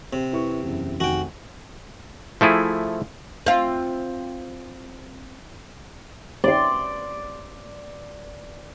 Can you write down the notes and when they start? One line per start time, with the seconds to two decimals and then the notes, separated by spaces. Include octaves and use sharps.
0.13 C3
0.33 E4 B4 C#6
0.63 F#1 E2
1.00 F1 D#3 F#4 G5 G#5
2.41 F3 A3 E4 G#4
3.46 C4 F4
6.44 D5 C6